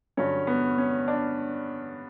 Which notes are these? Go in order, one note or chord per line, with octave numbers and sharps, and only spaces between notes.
G2 D3 F#3 C#4
B3
C#4
D4